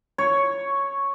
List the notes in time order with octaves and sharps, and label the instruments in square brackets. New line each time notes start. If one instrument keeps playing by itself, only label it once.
[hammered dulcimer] C#5